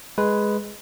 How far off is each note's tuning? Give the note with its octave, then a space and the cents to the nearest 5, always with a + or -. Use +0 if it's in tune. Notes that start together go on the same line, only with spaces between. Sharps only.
G#3 +0 B4 +0